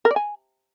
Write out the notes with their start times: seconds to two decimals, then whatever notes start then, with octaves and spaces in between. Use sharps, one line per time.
0.05 A#4
0.11 D5
0.16 G#5